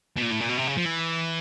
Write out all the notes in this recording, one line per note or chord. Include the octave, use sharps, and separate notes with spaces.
B2
A#2
A2
A#2
B2
C3
C#3
F3
E3